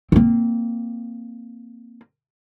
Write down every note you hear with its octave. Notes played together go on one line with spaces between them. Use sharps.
A#3 C4